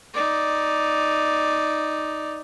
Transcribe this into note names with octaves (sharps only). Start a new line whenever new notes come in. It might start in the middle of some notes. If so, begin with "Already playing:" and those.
D#4 D5